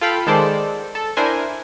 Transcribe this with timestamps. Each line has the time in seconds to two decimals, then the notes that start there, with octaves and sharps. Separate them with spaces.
0.01 F4 A4 F5 G5 B5
0.27 D#3 G#3 A4 C5 D5
0.95 A4
1.17 D4 E4 A#4 C5 G#5